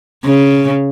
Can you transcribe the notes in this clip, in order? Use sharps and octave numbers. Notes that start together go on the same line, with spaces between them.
C#3